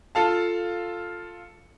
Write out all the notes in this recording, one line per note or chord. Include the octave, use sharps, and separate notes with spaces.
F4 A4 F5 A5